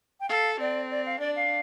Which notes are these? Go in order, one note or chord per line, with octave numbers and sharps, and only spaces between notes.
G5
A4 F5
C4 D5
D5
F5
D4 D5
F5